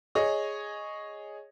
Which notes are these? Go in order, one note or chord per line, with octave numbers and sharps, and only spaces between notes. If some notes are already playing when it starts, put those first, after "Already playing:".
G#4 C#5 D#5